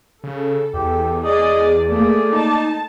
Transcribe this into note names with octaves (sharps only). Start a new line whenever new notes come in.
C#3 A4
E2 G4
G#4 D5 D#5
A3 A#3 G#4 D5
D#4 A5